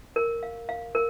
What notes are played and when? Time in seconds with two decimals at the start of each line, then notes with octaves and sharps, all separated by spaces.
0.16 A#4
0.43 F5
0.69 F5
0.95 A#4